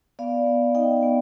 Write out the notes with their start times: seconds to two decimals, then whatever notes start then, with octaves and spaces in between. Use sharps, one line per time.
0.19 B3 D5 F5
0.46 B3
0.75 D#4 D#5 G5
1.03 B3